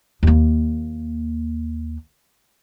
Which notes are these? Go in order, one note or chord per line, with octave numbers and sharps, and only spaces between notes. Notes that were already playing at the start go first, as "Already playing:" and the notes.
D#2 A#3